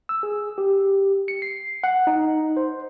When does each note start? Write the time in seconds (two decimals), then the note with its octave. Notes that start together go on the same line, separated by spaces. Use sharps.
0.09 E6
0.23 G#4
0.58 G4
1.28 C#7
1.42 C7
1.84 F#5
2.07 D#4
2.57 C5